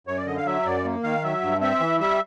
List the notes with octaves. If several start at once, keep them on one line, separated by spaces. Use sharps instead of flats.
F#2 C#5
D5
D3 D#5
F5
F#3 E5
F#2 D5
A#3
D#3 F5
F#3 E5
G2
C4 E5
E3
G3 E5